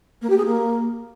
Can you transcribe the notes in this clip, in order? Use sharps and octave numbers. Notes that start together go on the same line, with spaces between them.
A#3
G4
G#4
A#3